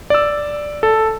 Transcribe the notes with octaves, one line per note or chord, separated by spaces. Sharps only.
D5 E6
A4